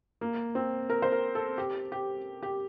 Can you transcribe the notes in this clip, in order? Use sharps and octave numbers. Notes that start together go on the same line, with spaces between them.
A#3
C4
A#4
C5
A#4
A4
G4
G4
G4